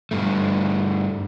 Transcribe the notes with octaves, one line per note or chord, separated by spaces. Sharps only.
G2 A3